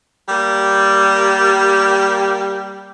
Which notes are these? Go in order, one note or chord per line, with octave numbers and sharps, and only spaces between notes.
G3 A#3 G4